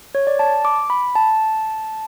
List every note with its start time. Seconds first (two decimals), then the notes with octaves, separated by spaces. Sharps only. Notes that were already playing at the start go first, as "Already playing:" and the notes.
0.15 C#5
0.27 D5
0.39 A5
0.65 D6
0.90 B5
1.16 A5